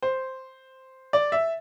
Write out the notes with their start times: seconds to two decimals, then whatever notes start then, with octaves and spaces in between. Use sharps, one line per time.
0.02 C5
1.13 D5
1.32 E5